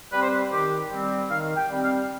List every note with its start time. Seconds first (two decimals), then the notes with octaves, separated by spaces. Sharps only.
0.12 G3 C4 B4
0.21 C5
0.29 B4
0.52 D#3 G4
0.90 G3 C4
1.30 D#3 F5
1.56 G5
1.70 G3 C4
1.82 F5